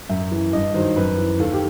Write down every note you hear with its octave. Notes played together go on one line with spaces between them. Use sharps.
F#2 E5
E3
G2 D#5
D#3 F#3 C5
F#2 B4
E3
D#2 A4
G4